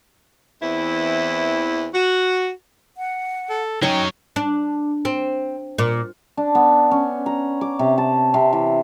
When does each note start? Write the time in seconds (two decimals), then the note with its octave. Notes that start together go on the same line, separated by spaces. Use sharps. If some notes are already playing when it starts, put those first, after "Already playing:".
0.62 E2 E3 C4 E4
1.94 F#4
2.97 F#5
3.50 A4
3.82 F#3 C#4 D#4 C#5 G5 C#6
4.36 D4
5.05 C4
5.78 A#2
6.37 D4
6.55 B3
6.91 C#4
7.26 A#5
7.61 D6
7.79 C3
7.98 A5
8.34 C3
8.53 E3